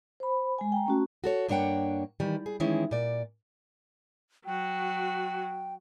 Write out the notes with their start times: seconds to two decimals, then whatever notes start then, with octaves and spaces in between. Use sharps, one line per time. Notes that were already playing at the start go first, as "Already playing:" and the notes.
0.20 C5 B5
0.58 G#3 G#5
0.72 G5 A#5
0.86 A3 C#4 F#4
1.24 F#4 A4 C#5
1.48 G2 A#3 D4 C#5 F#5 G5
2.20 D#3 E3 G3
2.46 G#4
2.60 D#3 E3 G#3 C#4 E4
2.91 A#2 D5
4.46 F#3 F#4 G5